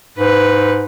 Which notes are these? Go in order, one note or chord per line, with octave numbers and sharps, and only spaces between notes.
G#2 B4